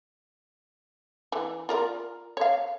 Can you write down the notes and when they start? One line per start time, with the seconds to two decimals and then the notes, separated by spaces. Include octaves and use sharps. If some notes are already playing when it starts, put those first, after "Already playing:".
1.32 E3
1.69 F4 A#4 D5
2.37 C#5 F5